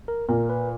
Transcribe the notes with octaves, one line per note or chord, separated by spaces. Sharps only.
A#4
A#2 A#4
B4